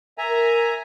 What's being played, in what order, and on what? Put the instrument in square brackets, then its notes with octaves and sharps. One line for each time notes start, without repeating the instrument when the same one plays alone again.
[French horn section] A#4 [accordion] E5 G#5 A#5